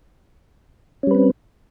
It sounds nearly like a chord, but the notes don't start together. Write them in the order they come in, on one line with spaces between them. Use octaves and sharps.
C#4 G3 B4 C4